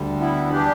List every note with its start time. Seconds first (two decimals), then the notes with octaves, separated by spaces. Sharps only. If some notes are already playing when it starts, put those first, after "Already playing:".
Already playing: D2 D3 G3
0.20 B3 E4
0.52 E3 G3 D4 G4